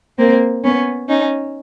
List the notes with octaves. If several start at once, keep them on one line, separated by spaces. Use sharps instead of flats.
A#3 C4
B3 C#4
C#4 D#4